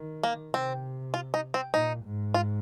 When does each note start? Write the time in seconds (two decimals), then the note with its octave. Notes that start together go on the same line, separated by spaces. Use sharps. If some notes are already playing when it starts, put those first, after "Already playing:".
Already playing: D#3
0.23 A#3
0.53 C3 C4
1.14 F4
1.34 D#4
1.54 C4
1.74 A#2 D#4
2.04 G#2
2.34 F4